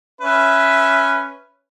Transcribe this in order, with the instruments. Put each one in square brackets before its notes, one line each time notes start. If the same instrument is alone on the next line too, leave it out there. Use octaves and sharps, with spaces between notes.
[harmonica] C#4 B4 E5